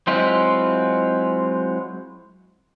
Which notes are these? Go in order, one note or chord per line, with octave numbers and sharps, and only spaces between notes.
F#3 G#3 C4 E4 F4